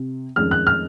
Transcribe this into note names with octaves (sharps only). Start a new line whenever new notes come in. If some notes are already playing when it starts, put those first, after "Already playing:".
Already playing: C3
F2 D#3 G#3 C#4 F6
F#6
F6